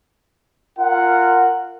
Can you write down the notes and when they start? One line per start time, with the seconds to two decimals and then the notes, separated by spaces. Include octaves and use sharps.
0.78 F4 A#4 F#5